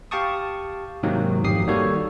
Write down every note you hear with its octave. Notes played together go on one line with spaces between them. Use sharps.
G4 F5 G5 A5 C#6 D#6
G#2 C3 D#3 F#3 A#3
G#1 F2 G4 D#6 C7
D#3 G3 A#3 F#4 A4 C#5